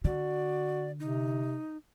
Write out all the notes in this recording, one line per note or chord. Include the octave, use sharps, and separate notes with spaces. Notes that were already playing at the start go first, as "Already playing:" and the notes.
D3 F#4 D5
C3 D#4